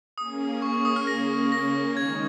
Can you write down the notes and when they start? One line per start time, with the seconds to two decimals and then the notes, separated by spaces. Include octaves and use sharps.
0.18 A#3 C#4 G#4 D#6
0.62 C#6
0.74 C#6
0.85 D#6
0.96 F6
1.07 C#3 A#3 C#4 A#6
1.52 A#6
1.96 D#3 G#3 D#4 G#6